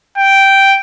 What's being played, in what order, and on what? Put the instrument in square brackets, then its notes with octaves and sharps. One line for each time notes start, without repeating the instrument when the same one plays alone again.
[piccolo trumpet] G5